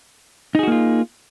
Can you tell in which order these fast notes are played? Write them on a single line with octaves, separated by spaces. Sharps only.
D#4 G#4 F#4 A#3 F4